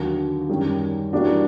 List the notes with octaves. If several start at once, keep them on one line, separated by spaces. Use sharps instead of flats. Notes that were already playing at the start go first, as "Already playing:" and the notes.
Already playing: D#2 D3 F#3
F#2 D#3 G3
E3 G3 A#3 D4 F#4